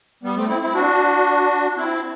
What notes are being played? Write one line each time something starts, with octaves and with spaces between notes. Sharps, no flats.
G3 B3
A3 C4
C4 E4
C4 E4
D4 F#4
C4 E4